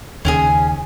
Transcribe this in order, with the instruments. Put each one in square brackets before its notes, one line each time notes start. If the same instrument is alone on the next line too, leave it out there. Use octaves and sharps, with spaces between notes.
[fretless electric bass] D#2 C#3 [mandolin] C#4 G4 G#4